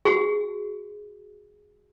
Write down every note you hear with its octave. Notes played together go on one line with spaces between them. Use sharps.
F#4 G#4